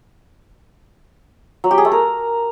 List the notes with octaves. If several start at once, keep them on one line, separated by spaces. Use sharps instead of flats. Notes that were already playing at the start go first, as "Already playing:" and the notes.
F#3
G4
G#4
A3
A#4